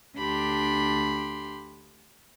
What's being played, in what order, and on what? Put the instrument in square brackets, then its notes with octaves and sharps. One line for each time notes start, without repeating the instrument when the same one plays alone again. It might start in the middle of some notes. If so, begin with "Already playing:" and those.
[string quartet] D2 D4 G4 B5 C6